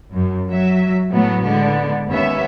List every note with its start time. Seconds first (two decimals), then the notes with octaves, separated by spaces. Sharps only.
0.14 F#2
0.49 F#3 E5
1.11 A2 F#3 A3 B3
1.45 D3 G#3 B3
2.08 D#2 B3 C#4 E5